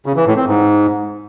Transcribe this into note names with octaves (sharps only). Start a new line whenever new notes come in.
C#3
E3
A2
C4
G#2